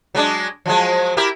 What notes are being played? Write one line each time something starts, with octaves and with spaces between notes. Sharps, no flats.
F#3 G#3 D4
F3 F#3 G#3
E4 G4 A#4